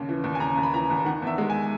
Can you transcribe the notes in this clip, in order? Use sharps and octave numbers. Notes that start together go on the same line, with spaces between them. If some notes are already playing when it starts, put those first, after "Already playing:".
Already playing: D#2 C#3
E3
D#2
G#5
C#3 A#5
D#2
B5
E3 A#5
D#2
D#3 F#5
E2 E5
G#3
G#5